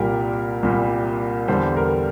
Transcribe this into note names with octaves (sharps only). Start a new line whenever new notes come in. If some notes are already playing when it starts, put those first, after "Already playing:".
Already playing: C2 A#2 G3 G4 A#4
C2 A#2 G3
E2 D3 G3 A4 C5
G4 A#4